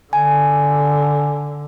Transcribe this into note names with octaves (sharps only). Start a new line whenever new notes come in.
D3 G#5